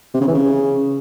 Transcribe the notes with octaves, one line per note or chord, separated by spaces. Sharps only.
C3
C#3
E3
C#3